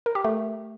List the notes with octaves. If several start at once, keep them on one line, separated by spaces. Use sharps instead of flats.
A#4
G4
A3